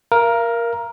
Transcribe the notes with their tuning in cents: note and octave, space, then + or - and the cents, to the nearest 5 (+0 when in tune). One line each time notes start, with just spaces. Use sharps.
A#4 +10 F5 -35